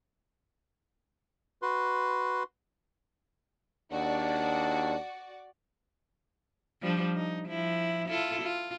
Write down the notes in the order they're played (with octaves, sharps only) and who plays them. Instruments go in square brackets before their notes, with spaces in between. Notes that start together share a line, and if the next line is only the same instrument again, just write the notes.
[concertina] F#4 B4 C6
[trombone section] D#2 D4 [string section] F#4 D5
[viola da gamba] F3 G3 D4
D#4
F3 E4
E4 F4 A4
F4